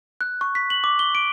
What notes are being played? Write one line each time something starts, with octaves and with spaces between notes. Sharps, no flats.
F#6
C#6
B6
F#7
D6
G7
D7